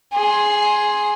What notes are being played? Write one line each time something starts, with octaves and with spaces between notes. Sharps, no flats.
G#4 C6